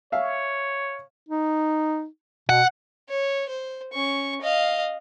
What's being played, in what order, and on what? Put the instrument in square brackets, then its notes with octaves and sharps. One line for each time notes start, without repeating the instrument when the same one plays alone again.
[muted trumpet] C#5 [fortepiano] E5 F5
[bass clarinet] D#4
[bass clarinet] B2 [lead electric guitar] F#5
[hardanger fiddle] C#5
C5
C#4 C#6
D#5 F5